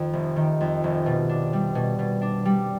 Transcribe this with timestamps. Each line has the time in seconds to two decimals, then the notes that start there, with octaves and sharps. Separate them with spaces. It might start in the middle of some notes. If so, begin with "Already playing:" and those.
Already playing: F2 D#3
0.13 F1
0.36 D#3
0.61 F2
0.84 F1
1.06 B2
1.29 D4
1.53 G3
1.75 B2
1.99 B2
2.22 D4
2.45 G3